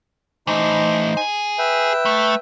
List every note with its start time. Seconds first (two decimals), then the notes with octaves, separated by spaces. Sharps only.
0.47 E3 A3 D#4 C5
1.17 G#4 G#5
1.59 B4 E5 G5
2.05 A3